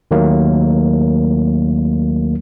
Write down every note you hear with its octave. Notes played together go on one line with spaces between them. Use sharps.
D#2 D#3 F#3 A3 A#3